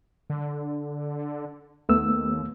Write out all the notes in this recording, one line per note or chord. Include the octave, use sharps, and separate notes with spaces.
D3
D#2 A3 B3 E6